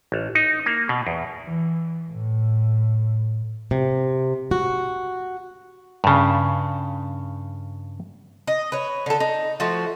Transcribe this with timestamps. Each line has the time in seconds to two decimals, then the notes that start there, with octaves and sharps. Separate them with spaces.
0.12 A1
0.35 D#4
0.66 A#3
0.89 B2
1.07 E2
1.45 E3
2.10 A2
3.71 C3
4.51 F#4
6.04 G2 C#3
8.47 D#5
8.72 B4 C#5
9.06 D3 A4
9.20 D#4
9.60 F3 A3 F#4